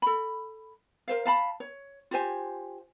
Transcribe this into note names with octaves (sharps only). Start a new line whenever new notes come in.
A4 B5
A#4 C5 F5
F5 A5 B5
C#5
F4 G4 C5 G#5